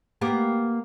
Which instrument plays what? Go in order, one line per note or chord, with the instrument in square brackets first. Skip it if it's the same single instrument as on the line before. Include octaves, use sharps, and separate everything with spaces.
[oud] A#3 B3 G4